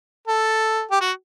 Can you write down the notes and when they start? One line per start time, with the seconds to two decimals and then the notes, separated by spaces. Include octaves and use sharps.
0.28 A4
0.91 G4
1.01 F#4